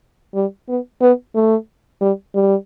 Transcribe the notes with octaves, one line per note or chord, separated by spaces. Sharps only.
G3
B3
B3
A3
G3
G3